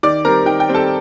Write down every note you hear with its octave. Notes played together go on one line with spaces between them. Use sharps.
D#3 D5 D6
G3 C4 A#4 A#5
D#3 G5
G5
G3 C4
A4 A5